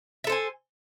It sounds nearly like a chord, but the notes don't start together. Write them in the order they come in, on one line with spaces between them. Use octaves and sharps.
E5 A4 C5 G#5